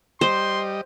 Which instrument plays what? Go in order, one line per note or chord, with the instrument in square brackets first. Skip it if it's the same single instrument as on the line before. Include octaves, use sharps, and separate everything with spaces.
[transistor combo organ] G3 D#5 [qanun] C5 [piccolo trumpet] C6